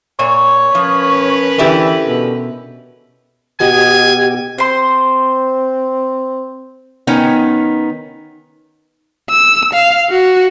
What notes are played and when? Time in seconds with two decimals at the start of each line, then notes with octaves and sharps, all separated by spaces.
0.19 A#2 C#5
0.75 F3 C#4 A#4 B4
1.58 D3 E3 E4 G4
2.08 B2
3.60 B2 B3 G4 D#5 G5 G#5
4.58 C4 C5 C6
7.07 D#3 B3 C#4 D#4 C#5 G5
9.30 E6
9.74 F5
10.10 F#4